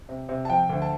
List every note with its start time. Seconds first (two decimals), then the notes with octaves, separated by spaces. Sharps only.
0.09 C3
0.29 C3
0.45 A5
0.50 F3 G5
0.70 D2
0.82 A5